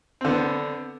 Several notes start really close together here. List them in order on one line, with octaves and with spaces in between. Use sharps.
C4 D3 B3